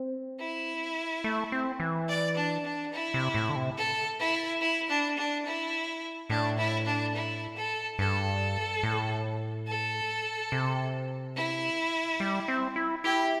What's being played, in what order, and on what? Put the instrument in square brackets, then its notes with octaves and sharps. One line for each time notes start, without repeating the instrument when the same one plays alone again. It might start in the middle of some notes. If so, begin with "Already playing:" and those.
Already playing: [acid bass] C4
[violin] E4
[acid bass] A3
C4
E3
[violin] D5
D4
D4
E4
[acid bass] C3
A2
D3
C3
[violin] A4
E4
E4
D4
D4
E4
[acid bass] A2 [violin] D4
[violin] E4
D4
E4
A4
[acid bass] G2 [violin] A4
[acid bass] A2
[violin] A4
[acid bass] C3
[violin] E4
[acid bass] G3
C4
E4
[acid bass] E4 [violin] G4